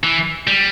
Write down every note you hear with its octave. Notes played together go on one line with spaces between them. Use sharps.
E3
G3